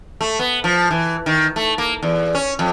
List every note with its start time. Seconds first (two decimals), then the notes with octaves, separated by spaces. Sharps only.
0.21 A3
0.39 B3
0.64 F3
0.91 E3
1.26 D#3
1.56 A3
1.78 A#3
2.03 E2
2.35 C#4
2.59 F2